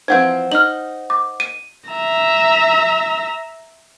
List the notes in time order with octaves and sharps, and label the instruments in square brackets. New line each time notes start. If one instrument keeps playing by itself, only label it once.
[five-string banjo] E3 F3 C4 [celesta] C5 F#5 G6 [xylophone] G#6
[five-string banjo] D#4 [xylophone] F6 F#7
[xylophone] D6
D#7
[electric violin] E5 A#5